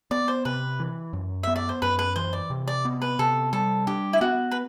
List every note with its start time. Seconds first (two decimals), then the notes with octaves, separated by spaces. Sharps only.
0.11 B3 D5
0.28 C5
0.45 C3 B4
0.80 E3
1.13 F#2
1.43 B3 E5
1.56 D5
1.69 C5
1.82 F#2 B4
1.99 B4
2.16 E3 C5
2.33 D5
2.50 C3
2.68 D5
2.85 B3
3.02 B4
3.19 C3 A4
3.53 G3 A4
3.87 D4 G4
4.13 E4
4.21 B3 F#4
4.51 B4